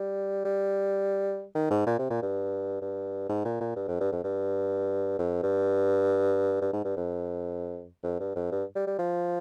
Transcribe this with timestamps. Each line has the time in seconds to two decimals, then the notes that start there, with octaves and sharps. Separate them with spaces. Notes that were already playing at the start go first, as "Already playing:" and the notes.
Already playing: G3
0.45 G3
1.55 D#3
1.71 G#2
1.86 A#2
1.99 C3
2.11 A#2
2.22 G2
2.81 G2
3.29 G#2
3.45 A#2
3.61 A#2
3.76 G2
3.88 F2
4.00 G2
4.12 F2
4.24 G2
5.19 F2
5.43 G2
6.61 G2
6.73 G#2
6.85 G2
6.97 F2
8.04 F2
8.20 G2
8.36 F2
8.52 G2
8.75 G3
8.87 G3
8.99 F3